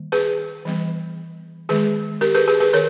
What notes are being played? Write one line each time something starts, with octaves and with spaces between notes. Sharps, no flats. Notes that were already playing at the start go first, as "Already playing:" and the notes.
Already playing: D#3 G3 A#3
G#4 B4
E3 G3 B3
D#3 G#3 B3 G#4 B4
G4 A#4
G#4 B4
G#4 B4
G#4 B4
D#3 A#4 C#5